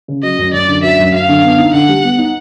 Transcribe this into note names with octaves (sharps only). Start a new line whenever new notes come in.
C#3
F#3 D#5
F#2
F#2 D5
D3
F#3 E5
F#2
F#2 F5
D3
B3
D#4
D3 F#5
G3
B3
D#4